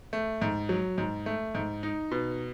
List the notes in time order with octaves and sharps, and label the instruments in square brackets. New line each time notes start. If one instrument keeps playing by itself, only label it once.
[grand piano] A3
G#2
F#3
G#2
A3
G#2
D#4
B2